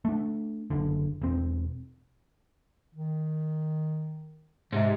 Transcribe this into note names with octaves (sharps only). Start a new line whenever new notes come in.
A3 D4
F#1 D3
E1 C4
D#3
G#2 C3